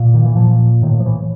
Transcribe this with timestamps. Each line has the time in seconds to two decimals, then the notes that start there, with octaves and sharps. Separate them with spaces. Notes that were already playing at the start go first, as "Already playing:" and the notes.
Already playing: A#2
0.14 D#3
0.24 E3
0.35 A#2 F3
0.82 A2 D#3
1.00 F3
1.06 E3